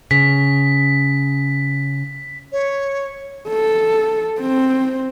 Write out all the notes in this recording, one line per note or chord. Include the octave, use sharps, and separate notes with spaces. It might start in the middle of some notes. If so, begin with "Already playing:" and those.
C#3 B6
C#5
A4
C4